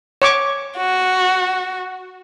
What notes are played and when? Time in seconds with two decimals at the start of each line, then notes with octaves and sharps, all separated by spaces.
0.22 C#5 C#6 D6
0.77 F#4